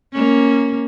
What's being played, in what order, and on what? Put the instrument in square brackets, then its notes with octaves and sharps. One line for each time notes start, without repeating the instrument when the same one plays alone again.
[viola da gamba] A#3 C#4